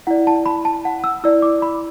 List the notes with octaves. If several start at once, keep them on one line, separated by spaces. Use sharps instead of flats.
E4 D5 F#5
A5
B5
A5
F#5
E6
E4 D5 E6
D6
B5